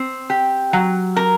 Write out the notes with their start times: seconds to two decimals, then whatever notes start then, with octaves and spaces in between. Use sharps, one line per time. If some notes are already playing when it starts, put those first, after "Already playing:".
Already playing: C4
0.30 G4
0.73 F#3
1.16 A#4